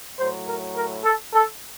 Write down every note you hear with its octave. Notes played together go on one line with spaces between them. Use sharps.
A2 F#3 C5
A#4
A#4
A4
A4